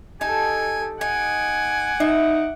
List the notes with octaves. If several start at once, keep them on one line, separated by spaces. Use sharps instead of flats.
D#4 G4 A4 G#5 A5
D#4 F#5 G#5 D6
D#4 E5